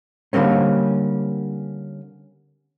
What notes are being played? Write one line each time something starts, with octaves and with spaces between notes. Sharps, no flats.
D3 G3 A#3 C4 C#4